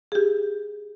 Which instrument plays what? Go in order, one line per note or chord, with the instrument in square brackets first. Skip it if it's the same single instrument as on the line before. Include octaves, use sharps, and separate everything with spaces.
[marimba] G4 G#4